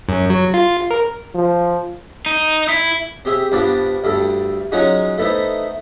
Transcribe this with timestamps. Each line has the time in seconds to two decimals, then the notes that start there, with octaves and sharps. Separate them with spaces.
0.09 F#2
0.30 F#3
0.54 F4
0.91 A#4
1.35 F3
2.26 D#4
2.69 E4
3.25 C4 G4 G#4 E5
3.52 G2 F3 B3 D4 A5 D6
4.04 D2 G2 A4
4.72 F#3 G#3 C#4 D#4 F4 F#4
5.18 A3 B3 D#4 E4 C5